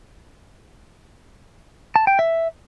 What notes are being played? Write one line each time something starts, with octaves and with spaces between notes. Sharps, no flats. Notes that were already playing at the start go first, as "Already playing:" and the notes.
A5
G5
E5